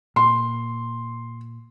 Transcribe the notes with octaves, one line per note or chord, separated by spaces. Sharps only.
A#2 C6